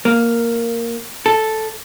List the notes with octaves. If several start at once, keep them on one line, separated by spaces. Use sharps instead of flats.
A#3
A4